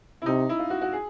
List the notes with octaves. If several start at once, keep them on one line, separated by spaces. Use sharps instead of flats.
E4
C3 D#4
E4
F4
F#4
F#4
G#4